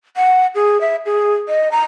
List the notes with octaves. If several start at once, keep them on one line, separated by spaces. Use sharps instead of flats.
F#5
G#4
E5
G#4
D#5
A#5